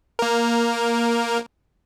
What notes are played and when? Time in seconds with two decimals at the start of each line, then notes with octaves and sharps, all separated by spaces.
0.19 A#3 A#4